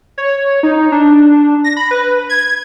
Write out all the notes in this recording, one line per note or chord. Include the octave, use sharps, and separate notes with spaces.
C#5
D#4
D4
A#6
B5
B4
G#6